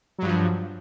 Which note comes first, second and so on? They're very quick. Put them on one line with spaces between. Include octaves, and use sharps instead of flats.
F#3 G2 F3